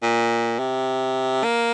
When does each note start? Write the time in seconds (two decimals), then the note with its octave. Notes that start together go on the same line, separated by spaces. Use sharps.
0.03 A#2
0.59 C3
1.44 A#3